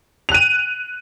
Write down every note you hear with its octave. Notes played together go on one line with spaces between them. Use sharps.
F#6 D#7 F7